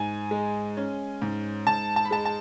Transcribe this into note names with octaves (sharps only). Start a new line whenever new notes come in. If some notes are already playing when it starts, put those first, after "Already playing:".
Already playing: G#2 G#5
G#3
C#4
G#2
G#2 A5
A5
B5
G#3 A5
A5